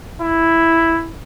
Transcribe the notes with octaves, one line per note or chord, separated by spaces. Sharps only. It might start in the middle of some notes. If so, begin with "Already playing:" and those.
E4